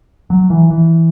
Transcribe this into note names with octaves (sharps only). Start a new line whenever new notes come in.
F#3
E3
E3